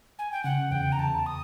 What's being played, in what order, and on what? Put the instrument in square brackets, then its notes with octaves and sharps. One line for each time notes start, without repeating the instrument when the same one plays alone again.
[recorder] G#5
G5
[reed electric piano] C#3 [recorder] F#5
[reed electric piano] E2 [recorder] G5
[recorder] A#5
[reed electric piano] E2 [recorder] A5
[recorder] D#6